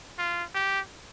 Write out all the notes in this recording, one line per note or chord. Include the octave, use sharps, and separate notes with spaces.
F4
G4